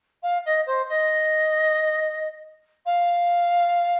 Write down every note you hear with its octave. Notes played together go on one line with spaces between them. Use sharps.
F5
D#5
C5
D#5
F5